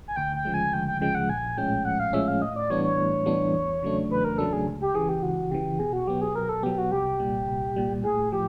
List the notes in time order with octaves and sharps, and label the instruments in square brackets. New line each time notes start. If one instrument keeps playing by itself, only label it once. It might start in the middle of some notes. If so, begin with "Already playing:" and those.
[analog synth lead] G#5
[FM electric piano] D2 [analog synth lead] G5
[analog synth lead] G5
[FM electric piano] C#3 F3 G#3
[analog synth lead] G#5
[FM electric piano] D2 [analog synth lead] G5
[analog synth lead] G5
[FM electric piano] C#3 F3 G#3 [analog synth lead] G5
[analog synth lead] F#5
[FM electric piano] A#1 [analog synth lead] G#5
[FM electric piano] A2 F3 G#3 C#4 [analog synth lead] G5
[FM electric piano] A#1 [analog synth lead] F#5
[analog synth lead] F5
[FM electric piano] A2 F3 G#3 C#4 [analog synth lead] E5
[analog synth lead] F5
[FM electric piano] A2 [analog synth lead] D#5
[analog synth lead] D5
[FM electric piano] E3 G3 B3 D4 [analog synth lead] C#5
[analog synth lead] C#5
[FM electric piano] A2
E3 G3 B3 D4
E2
C#3 F#3 A3 D4
[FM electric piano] E2 [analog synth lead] B4
[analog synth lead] A#4
[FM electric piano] C#3 F#3 A3 D4 [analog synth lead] A4
[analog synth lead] G#4
[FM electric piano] C#2
[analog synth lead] G4
[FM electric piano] C#3 E3 [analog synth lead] G#4
[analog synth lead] G4
[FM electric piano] C#2 [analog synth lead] F#4
[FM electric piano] C#3 E3 [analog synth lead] G4
[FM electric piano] B2 [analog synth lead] G#4
[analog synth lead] F#4
[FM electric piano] F#3 B3 [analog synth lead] G4
[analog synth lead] G#4
[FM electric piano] B2 [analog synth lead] A#4
[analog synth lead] A4
[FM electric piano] F#3 B3 [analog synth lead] G4
[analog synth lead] F#4
[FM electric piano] C2 [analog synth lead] G4
[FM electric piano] A#2 G3
C2
A#2 G3
[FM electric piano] A2 [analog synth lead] G#4
[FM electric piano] F3 [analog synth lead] G4